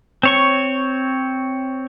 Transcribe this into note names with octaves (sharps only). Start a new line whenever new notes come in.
C4 C#5 C#6